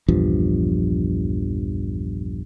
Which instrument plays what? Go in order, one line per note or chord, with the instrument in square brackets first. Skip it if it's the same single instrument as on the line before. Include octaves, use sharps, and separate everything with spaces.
[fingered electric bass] A#1 E2 G2 F3